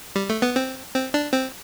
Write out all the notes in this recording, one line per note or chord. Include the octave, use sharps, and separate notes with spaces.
G3
A3
B3
C4
C4
D4
C4